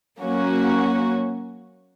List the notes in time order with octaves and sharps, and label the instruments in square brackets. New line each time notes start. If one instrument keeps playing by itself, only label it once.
[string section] F#3 A#3 C#4 F#4